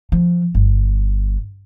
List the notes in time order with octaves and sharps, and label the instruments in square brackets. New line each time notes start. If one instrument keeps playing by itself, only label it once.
[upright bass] F3
G1